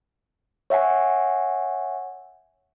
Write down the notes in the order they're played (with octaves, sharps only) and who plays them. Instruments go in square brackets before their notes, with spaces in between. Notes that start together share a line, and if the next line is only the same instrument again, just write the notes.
[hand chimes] C#5 E5 F#5 G#5